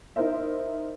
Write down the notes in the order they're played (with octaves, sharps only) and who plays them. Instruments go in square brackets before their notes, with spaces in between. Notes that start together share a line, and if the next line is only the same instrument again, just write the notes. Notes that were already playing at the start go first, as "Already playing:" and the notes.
[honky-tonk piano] D#4 E4 A#4 C5 E5